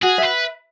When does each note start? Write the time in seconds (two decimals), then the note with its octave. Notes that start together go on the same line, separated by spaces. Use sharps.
0.03 F#4 G#4
0.18 E5
0.23 B4